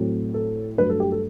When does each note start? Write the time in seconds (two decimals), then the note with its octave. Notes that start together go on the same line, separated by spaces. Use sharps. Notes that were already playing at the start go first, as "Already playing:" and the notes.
Already playing: A2 F#3 A3 C4
0.34 A4
0.78 G2 F#3 A3 B4
0.89 A4
1.00 G4
1.12 A4